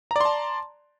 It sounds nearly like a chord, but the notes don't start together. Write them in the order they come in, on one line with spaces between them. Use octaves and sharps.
A#5 D5 C6 A5